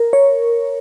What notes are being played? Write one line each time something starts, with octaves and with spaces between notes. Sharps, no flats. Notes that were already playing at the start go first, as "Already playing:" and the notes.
Already playing: A#4
C#5